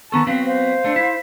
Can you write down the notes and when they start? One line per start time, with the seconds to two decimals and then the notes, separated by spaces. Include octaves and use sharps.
0.12 D#3 B3 A4 A5 A#5 C#6
0.27 F#3 B3 C4 F5
0.45 C5 F5
0.84 A3 D4
0.96 E4